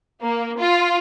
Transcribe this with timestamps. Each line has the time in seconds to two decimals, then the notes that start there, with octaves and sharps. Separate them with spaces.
0.22 A#3
0.58 F4